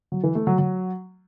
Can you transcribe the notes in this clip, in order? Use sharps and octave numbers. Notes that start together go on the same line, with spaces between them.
F#3
E3
A3
F#3
F#3